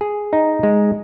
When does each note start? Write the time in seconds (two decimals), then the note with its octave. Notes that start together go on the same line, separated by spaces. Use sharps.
0.01 G#4
0.33 D#4
0.63 G#3